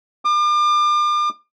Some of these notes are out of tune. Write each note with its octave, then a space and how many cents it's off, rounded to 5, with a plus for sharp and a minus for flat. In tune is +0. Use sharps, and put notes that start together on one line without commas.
D6 +40